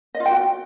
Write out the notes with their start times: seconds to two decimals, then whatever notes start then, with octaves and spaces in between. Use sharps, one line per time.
0.15 D#5
0.20 F4
0.26 G5
0.31 F#4